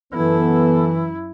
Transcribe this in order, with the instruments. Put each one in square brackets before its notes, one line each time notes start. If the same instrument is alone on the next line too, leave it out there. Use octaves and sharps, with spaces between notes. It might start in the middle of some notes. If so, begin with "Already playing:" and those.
[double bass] F#2 E4 [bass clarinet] E3 [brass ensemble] B3 A4